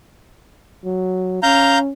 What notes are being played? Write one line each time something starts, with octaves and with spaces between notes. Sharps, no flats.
F#3
C#4 F5 A#5 G6